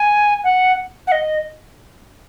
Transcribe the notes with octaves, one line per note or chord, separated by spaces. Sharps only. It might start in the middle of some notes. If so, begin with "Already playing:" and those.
Already playing: G#5
F#5
F#5
D#5